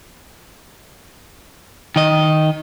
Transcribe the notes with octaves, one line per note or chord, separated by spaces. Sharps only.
D#3 D#5